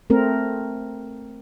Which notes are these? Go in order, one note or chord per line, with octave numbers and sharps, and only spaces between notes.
A3 C4 A#4